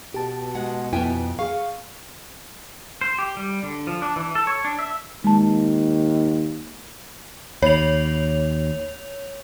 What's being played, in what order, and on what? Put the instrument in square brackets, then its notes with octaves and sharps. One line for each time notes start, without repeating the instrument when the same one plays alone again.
[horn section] B2 [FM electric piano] G4 A5
[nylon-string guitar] G#3 F#5
[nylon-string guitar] F2 G5 G#5 [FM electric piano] B3 E4
[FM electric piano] G#4 C#6 [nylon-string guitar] F5
[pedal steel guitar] C5
G4
G3
D3
F3
D4
E3
A4
C#5
D4
E5
[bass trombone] D#2 [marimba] G#3 A5
[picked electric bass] D#2 [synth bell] C#5 F7